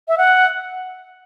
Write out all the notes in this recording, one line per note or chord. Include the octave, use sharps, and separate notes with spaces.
E5
F#5